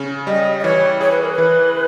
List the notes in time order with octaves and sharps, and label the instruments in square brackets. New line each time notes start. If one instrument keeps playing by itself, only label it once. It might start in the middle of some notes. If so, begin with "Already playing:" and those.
Already playing: [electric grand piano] C#3 C#4
[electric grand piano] G3 [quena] D#5
[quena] D#5
[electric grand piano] E3 [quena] C#5
[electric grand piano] G#4 [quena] C#5
[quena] B4
A#4
B4
[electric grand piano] E3